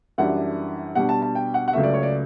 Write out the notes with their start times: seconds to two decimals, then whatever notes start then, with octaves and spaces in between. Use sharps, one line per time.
0.18 F#2 E3 G3 D4 F#5
0.95 B2 G3 D4 F#5
1.09 A5
1.22 A5
1.35 G5
1.54 F#5
1.68 F#5
1.73 C#2 C#3 F#3 A3 E5
1.83 D5
1.94 C#5
2.03 D5